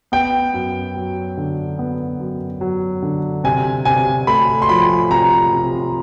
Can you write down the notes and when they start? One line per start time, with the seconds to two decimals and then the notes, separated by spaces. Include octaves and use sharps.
0.12 B3 G5
0.54 F#2
0.95 F#3
1.37 D3
1.79 B3
2.20 F#2
2.61 F#3
3.02 D3
3.44 C3 G#5
3.85 C3 G#5
4.27 A3 B5
4.62 C6
4.69 F3 B5
5.10 C3 A#5
5.52 C3